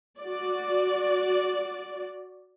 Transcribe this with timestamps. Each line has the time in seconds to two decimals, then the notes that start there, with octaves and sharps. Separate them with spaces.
0.19 F#4 D5